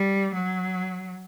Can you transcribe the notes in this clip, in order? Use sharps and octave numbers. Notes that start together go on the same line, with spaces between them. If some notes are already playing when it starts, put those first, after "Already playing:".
Already playing: G3
F#3